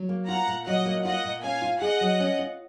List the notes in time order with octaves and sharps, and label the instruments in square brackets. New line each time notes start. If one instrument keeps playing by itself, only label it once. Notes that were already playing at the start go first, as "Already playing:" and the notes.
Already playing: [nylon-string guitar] F#3
A#3
[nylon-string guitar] F4 [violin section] F#5 A#5
[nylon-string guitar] A#2
[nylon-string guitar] F#3 [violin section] D#5 F#5
[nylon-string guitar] A#3
[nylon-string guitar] F4 [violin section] D#5 F#5
[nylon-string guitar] A#2
[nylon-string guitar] C#4 [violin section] F5 G#5
[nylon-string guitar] F4
[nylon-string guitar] G#4 [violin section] D#5 F#5
[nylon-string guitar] F#3
C#4
F4